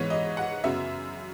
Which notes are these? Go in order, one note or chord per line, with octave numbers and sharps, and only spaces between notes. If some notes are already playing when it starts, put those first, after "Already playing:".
Already playing: G#2 E3 G#3 B3 C#5
D#5
F#5
F#2 C#3 F#3 B3 E5